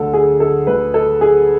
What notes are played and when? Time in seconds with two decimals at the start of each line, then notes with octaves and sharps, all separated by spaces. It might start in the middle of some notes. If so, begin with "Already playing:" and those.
Already playing: D2 D3 A4
0.13 G#4
0.40 A4
0.67 D2 D3 B4
0.94 A4
1.21 G#4